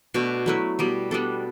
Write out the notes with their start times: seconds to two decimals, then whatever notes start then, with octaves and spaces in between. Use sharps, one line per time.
0.14 B2 A3 D4
0.46 F#3 A3 E4 B4
0.79 B2 G3 B3
1.11 G3 B3 D4 A4